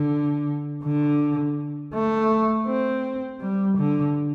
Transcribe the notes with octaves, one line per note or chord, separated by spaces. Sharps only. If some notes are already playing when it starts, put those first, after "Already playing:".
Already playing: D3
D3
A3
C4
G3
D3